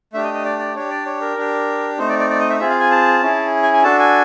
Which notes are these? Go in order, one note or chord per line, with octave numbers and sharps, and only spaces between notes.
A3 D4 G4 E5
D#5
D#5
D5
D5
D4 G4 C#5
D5
C#5
A#4
D4 G4
A3 C4 D#4 C5
D5
D5
D5
D#5
E5
C4 F4 G#4 E5
F5
G#5
A5
C#4 E4 G#4
G#5
G#5
D4 F#4 A4 A5
G#5